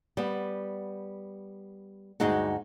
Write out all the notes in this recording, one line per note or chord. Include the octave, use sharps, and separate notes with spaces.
G3 B3
D2 G2 G#3 D#4 F#4 F#5